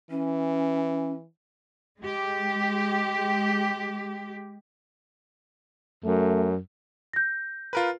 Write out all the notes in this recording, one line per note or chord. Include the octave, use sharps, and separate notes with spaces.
E3 C#4
G#3 G4
F#2 A3
G6 A#6
F4 A#4 B4